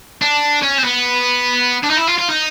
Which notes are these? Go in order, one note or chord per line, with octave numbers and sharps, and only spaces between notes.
D4
C#4
C4
B3
D4
D#4
E4
F4
F4
D#4